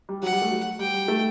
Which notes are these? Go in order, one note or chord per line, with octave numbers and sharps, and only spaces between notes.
G3
F#3 F#5
G3
A3
F#3
G3 G5
G3
A3